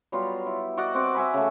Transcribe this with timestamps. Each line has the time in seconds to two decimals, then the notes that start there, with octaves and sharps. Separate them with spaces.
0.12 F#3 G3 B3 F4
0.47 E4
0.77 F#4 D5 D#5 F#5
0.94 C4 F#4 D#5 D6
1.15 E5 F#5 G#5 B5
1.34 C#3 A3